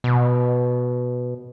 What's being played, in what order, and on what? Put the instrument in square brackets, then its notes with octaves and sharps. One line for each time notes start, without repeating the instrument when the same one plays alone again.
[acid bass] B2